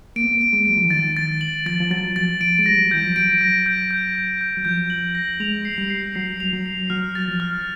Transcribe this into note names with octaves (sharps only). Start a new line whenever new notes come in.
A#3 D7
B3
A#3
D7
G#3
F#3 D7
F3
E3
D#3 A6
A6
F#7
F3 A6
F3
F#3 A6
F3 A6
F3 D7
G#3
G3 A#6
F#3
E3 G6
F3
F#3 D7
A#6
G6
G6
G6
G6
F#3
F3 G6
F#7
A#6
G#3 F7
C7
G3
C7
F#3 C7
F7
F#3
C7
F#3 F6
A6
F3
F6